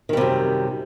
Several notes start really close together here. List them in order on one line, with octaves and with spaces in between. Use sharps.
D#3 G3 C3 F#2